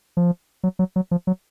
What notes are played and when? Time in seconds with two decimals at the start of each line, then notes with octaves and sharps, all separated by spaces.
0.17 F3
0.63 F#3
0.79 F#3
0.96 F#3
1.11 F3
1.27 F#3